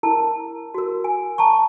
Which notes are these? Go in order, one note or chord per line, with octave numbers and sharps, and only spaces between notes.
E4 A#4 A5
F#4 A#4
G#5
A5 A#5 C#6